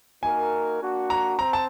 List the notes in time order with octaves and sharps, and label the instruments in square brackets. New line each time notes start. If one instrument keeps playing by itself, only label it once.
[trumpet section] A#3 D#4 F#4 A#4 [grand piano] G#5
[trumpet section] A#3 D4 F#4
[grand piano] A#5
[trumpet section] C4 [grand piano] A#5
[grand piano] A5